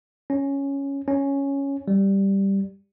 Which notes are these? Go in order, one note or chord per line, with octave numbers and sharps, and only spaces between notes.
C#4
C#4
G3